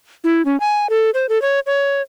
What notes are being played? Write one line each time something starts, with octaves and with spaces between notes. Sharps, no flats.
E4
C#4
G#5
A4
C5
A4
C#5
C#5